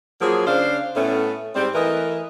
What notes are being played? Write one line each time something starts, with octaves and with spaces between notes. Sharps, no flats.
F3 F#3 A#3 G#4
C#3 D4 C5 F5
A2 A3 B3 C#4
G#2 G3 C4
E3 A3 A#4 B4 D#5